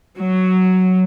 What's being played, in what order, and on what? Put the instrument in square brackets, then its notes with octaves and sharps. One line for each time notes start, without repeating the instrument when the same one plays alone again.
[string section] F#3